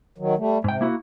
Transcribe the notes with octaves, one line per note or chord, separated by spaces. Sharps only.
D#3 F#3
G3 A3
G#2 C3 G5
A#3 E4 F#4